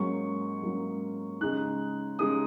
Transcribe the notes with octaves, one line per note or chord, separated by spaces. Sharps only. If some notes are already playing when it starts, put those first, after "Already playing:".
Already playing: G#2 F#3 A#3 C#4 C#6
G#2 F#3 A#3 C#4
C#3 G#3 D#4 F#6
C#3 G#3 D#4 D#6